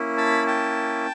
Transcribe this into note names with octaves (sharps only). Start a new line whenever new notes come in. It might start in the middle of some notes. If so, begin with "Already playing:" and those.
Already playing: A#3 C#4 E4
A5 B5
G5 A5